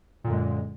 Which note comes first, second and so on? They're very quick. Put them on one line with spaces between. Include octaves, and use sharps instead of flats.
A#2 D3 F#2 G#3